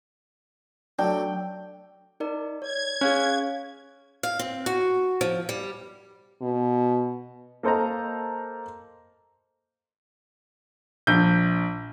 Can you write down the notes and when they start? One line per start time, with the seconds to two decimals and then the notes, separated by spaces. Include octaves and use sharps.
0.99 F#3 A3 D4 G5
2.20 D#4 A#4 D5
2.62 C#5 G#6
3.01 C#4 G#4 F5 F#6
4.23 F5
4.39 C4
4.66 F#4
5.21 F3
5.49 G3
6.42 B2
7.63 A#3 A4 C5 D#5 A#5
11.07 A#1 G6